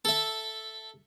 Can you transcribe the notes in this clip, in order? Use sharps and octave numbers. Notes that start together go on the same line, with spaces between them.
A4 E5